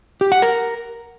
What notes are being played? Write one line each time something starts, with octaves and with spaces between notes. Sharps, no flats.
G4
F#5
A#4